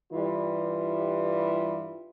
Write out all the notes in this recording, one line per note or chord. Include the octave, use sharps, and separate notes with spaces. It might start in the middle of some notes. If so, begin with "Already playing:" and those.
G2 E3 G3 F4